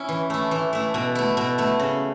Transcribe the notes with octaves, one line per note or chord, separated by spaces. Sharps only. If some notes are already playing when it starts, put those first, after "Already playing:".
Already playing: C#4 E4
E3
A3 E4
E3
A3 E4
B2
A3 E4
B2
A3 E4
C#3